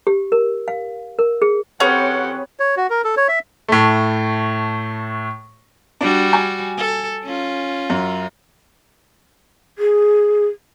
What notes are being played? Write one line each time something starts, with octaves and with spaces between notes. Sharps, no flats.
G4
A#4
F5
A#4
G#4
F2 C4 C#4 G4 G#4 B4 C#5 F#5
C#5
F#4
A#4
A4
C#5
E5
A2 A3
G3 D4 F#4
G#5
A4
C#4 F4
F#2
G#4